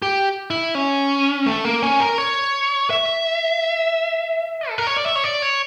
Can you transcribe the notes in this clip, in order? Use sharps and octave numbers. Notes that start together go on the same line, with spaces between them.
G4
E4
C#4
A3
A#3
C#4
A#4
C#5
E5
A4
A#4
C#5
D5
E5
C#5
D5
C#5